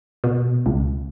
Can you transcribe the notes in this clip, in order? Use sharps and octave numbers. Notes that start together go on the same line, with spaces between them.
B2
C#2